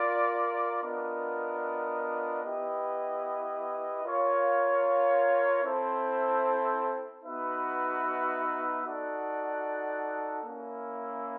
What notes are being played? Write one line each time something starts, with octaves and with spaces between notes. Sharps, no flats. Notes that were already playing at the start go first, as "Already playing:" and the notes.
Already playing: F4 A#4 D5
B3 D4 F4 A#4 D#5
B3 E4 G4 B4 D#5
F4 A#4 C#5 F5
C4 E4 A4 C5
B3 D#4 F#4 B4 E5
D#4 F#4 A4 D5 F#5
A#3 C#4 E4